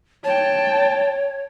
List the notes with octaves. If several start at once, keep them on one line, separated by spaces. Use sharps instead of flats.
C#5 G5 A5